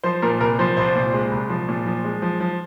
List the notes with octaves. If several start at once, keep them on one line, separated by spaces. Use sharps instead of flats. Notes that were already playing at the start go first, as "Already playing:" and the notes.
F3 C5
A#2 A#4
C2 A#4
F3 C5
C2 C5
A#2
G#3
C2
F3
A#2
F3
G#3
F3
F3